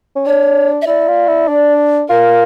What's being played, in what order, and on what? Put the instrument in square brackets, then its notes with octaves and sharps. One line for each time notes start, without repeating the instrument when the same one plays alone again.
[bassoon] C#4
[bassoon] D4 [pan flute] C#5
[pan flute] E5
[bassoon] E4 [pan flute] D5
[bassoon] F4
E4
D4
[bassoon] F4 [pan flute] A#4